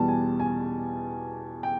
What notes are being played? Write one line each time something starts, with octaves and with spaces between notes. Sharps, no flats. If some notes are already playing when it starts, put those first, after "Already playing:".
Already playing: E2 B2 G3 A5
G#5
G#5
G5